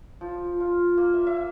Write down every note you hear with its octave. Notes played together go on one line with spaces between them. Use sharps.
F3
F4
A#3
E5
E5